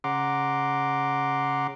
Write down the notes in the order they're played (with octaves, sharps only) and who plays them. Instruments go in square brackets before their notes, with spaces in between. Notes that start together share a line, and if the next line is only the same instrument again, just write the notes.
[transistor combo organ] C#3 F#5 A#5 C6 D6